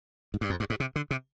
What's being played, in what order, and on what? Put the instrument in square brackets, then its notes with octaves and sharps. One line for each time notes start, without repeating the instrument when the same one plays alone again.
[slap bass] G#2
G2
F2
G2
G#2
C3
D3
C3